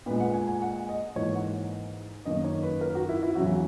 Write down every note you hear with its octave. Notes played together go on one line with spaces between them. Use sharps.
A#2 G#3 B4
F#5
G#5
G#5
F#5
D#5
G#2 E3 A#3 C#5
F#5
F#2 D#3 A#3 D#5
C#5
B4
A#4
F#4
E4
E4
E2 C#3 F#3 F#4